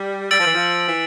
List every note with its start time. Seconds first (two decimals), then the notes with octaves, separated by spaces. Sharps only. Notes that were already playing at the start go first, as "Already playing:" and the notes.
Already playing: G3
0.30 G3 E6 A6 D7
0.38 F3
0.46 E3
0.54 F3
0.87 E3